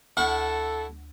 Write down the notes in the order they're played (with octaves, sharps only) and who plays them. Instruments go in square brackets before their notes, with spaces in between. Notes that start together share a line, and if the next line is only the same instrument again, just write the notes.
[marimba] D2 [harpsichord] E4 F#5 C#6 [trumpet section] A4